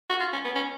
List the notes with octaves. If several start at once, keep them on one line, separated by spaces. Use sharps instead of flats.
F#4
F4
C#4
B3
C#4